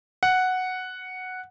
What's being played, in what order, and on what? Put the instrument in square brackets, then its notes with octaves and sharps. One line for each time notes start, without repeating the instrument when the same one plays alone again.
[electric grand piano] F#5